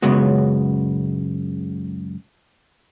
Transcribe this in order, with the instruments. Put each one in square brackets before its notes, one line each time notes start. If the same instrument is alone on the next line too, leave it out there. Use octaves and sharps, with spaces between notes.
[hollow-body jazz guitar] C#2 F#2 C#3 G#3 B3 F#4